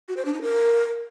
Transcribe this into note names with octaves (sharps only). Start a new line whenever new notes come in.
F#4
C5
D4
D#4
A#4